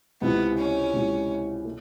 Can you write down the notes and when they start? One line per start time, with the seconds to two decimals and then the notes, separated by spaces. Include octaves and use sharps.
0.21 C#2 C3 E3 B3
0.57 C#4
0.93 C#2 C3 E3
1.65 A3